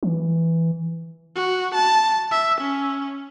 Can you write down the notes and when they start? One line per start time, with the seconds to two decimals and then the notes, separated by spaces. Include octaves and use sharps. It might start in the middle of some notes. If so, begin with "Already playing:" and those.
0.03 E3
1.36 F#4
1.75 A5
2.31 E5
2.61 C#4